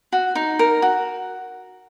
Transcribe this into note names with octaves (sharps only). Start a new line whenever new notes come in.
F#4
D#4
A#4
F#4